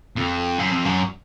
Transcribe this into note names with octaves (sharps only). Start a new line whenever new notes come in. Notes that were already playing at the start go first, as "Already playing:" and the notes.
F2
F#2
F2
F#2